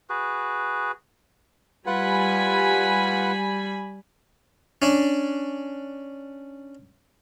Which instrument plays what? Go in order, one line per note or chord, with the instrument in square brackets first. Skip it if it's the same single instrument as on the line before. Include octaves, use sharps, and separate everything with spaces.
[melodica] F#4 G#4 B4
[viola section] G3 G#5 B5 [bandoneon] F4 B4 F#5
[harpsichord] C#4 D4